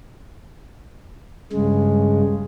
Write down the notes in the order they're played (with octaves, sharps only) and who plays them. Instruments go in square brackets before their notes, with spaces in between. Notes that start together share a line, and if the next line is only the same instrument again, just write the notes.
[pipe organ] G2 C#3 G#3